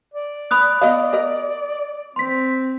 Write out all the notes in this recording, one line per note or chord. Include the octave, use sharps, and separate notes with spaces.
D5
B5 D#6 F#6
B3 D#5 F5 D#6
G4 A#4 D#5
C4 C6 B6